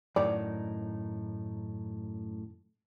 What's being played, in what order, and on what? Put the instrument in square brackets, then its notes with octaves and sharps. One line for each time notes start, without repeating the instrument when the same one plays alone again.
[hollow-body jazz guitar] F#2 A2 D#3 [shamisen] D5